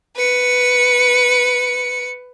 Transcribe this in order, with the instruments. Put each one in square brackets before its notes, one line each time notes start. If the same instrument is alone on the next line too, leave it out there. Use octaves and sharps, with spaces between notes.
[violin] B4 C#7